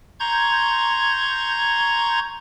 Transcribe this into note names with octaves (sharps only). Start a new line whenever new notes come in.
A#5 C6 C#6 G6 G#6